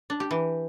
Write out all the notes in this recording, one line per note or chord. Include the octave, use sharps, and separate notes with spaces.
D4
G4
E3